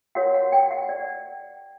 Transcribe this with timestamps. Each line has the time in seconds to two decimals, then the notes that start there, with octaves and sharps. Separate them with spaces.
0.15 F#4 A#4 C#5 F#5
0.34 F#5
0.52 G5
0.71 F#5
0.89 D5